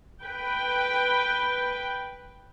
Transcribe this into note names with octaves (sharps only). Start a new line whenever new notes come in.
B4 G5